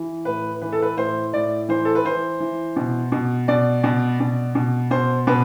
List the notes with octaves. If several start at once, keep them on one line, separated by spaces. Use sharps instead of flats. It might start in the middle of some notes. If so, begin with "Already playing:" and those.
Already playing: E3
A2 B4
E3 B4
A4
B4
A2 C5
A2 D5
E3 C5
A4
B4
E3 C5
E3
B2
B2
B2 D5
B2
B2
B2
B2 C5
B2 B4